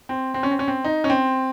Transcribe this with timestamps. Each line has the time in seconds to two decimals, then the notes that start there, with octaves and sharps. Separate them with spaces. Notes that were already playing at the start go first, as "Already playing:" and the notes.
0.09 C4
0.34 C4
0.43 C#4
0.51 C4
0.59 C#4
0.68 C4
0.85 D#4
1.04 C#4
1.10 C4